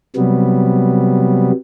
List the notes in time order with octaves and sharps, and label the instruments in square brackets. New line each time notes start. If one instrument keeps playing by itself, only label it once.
[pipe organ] C3 F#3 G3 B3